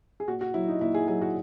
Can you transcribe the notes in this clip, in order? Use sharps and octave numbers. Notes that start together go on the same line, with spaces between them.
G#4
A#2 F#4
F#4
F#3 E4
D#4
A#2 E4
G#4
F#3 G#4
F#4